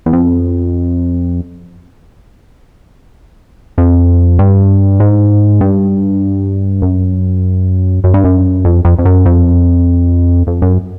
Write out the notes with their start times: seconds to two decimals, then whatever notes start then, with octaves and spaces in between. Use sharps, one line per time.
0.06 E2
0.13 F2
3.78 F2
4.39 G2
5.00 G#2
5.61 G2
6.82 F#2
8.04 F#2
8.14 G2
8.24 F#2
8.65 F2
8.85 F2
8.99 F2
9.05 F#2
9.25 F2
10.47 F2
10.62 F#2